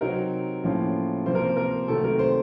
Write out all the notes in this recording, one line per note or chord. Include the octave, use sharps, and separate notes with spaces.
C3 F#3 C4 D#4 A#4
A2 F3 A#3 C#4 F4
C3 F3 A#3 C5
A#4
C5
A#4
C3 D#3 F#3 A3 A4
A#4
C5